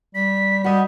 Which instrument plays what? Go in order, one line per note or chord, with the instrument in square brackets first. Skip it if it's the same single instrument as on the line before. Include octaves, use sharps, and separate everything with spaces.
[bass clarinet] G3 [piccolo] B6
[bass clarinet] G3 [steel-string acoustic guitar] F#4 D#5 G#5